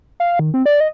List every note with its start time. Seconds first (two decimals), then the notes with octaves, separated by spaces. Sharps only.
0.20 F5
0.39 D#3
0.54 C4
0.66 D5
0.80 D#5